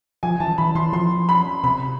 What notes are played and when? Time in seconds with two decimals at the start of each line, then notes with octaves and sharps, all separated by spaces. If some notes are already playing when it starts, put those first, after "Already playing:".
0.23 F3 G#5
0.40 E3 A5
0.58 E3 B5
0.75 E3 C6
0.93 F3 C6
1.29 B5
1.64 C3 B5